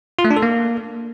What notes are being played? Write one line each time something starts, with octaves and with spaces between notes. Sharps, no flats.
F4
A3
D4
A4
A#3